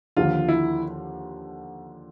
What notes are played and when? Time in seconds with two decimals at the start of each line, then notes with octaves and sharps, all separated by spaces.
0.17 D#2 D3 F3 F4
0.49 E4